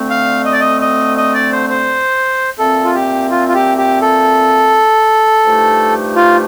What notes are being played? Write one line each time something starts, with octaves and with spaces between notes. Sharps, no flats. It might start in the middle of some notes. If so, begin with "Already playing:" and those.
Already playing: D2 D3 A3 C4
F5
D#5
D5
D#5
D#5
D#5
D5
C5
C5
A#2 A3 C4 A4
F4
G4
F4
F4
G4
G4
A4
G2 F3 A3 D#4 G4
F4